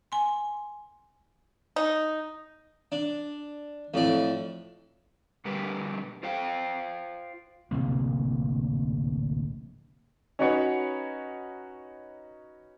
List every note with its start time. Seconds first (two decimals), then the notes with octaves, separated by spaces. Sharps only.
0.12 G#5 C6
1.76 D#4
2.92 D4
3.94 F2 A2 D5
5.45 B2 D3 G3 G4 A#4 B4
6.23 F4 C5 F5 G5
7.71 D1 A#1 C3 A#3
10.39 C#4 D#4 F#4 B4 C#5 F#5